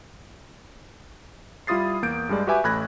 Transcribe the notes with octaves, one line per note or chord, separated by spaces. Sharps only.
G3 E4 F4 D#6 A6 C7
E2 A#3 G6 D7
G2 G3 G#3 D5
F#4 G4 B4 E5 G#5 D6
A1 A3 B5 F#6 G#6 A#6